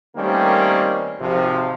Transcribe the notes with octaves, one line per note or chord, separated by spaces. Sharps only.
D#3 G3 A3 A#3 C4 C#4
G#1 C3 F3